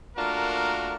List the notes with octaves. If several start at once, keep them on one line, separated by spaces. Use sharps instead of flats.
A3 A#3 D4 F4 F#4 A#4